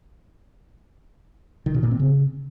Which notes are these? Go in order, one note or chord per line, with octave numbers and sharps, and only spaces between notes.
D#3
B2
A#2
C4
C#3